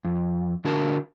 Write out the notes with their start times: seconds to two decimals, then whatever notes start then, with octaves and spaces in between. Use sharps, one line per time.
0.05 F2
0.65 D3 D4 F#4 A#4 A5